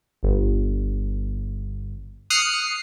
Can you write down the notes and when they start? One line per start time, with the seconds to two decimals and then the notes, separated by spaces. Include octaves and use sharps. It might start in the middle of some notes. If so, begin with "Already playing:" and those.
0.23 G1
2.30 D#6 F6 F#6 C7 C#7